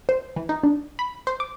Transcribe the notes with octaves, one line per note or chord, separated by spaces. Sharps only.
C5
E3
D#4
D4
B5
C5
D6